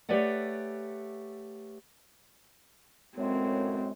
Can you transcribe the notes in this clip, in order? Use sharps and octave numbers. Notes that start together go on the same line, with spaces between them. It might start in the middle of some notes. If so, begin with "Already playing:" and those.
A3 G4 B4 C#5 D5 F#5
F#2 A2 G#3 C4